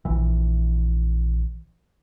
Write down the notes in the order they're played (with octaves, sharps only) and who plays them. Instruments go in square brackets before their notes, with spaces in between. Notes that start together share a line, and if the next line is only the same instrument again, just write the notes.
[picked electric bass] A#1 E3